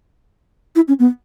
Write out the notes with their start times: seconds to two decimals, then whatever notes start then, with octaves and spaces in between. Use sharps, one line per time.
0.76 E4
0.88 C#4
0.99 B3